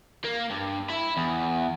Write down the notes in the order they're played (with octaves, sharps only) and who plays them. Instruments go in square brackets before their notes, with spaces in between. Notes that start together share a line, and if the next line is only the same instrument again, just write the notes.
[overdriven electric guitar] A#3
G2
E5 B5
E2